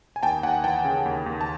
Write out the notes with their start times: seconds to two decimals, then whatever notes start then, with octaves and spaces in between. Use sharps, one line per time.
0.16 G#5
0.23 D#2 G5 A5
0.43 D#2 F#5 G#5
0.64 E3 G5 A5
0.85 C#3
1.06 D#2
1.26 D#2
1.41 A5